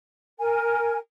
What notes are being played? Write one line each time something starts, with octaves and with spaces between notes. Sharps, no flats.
A#4 G#5